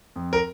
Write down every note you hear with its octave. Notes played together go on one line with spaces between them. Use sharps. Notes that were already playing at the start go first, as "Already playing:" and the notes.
F2
A#4